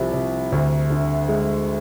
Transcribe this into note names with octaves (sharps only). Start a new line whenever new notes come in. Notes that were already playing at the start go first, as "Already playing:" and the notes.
Already playing: C2 C3 F3
C3
D2
D3
G#3